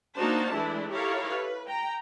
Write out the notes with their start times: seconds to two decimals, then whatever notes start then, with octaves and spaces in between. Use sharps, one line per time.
0.17 A#3 D4 D#4 F#4 C5 A5
0.53 E3 G#3 A3 D4 E4
0.93 E4 G4 A4 A#4 C#5 F5
1.30 B4
1.67 G5 A#5